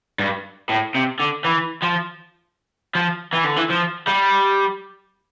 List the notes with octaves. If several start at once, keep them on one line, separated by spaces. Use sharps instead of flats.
G2
A2
C3
D3
E3
F3
F3
E3
D3
E3
F3
G3